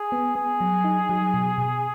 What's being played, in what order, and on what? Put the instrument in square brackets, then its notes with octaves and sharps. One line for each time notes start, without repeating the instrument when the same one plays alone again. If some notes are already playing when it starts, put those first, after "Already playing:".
Already playing: [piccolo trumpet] G#4
[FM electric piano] B3
[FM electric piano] B3 [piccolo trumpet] G#4
[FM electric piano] F#3
D#4
F#3
B2
B2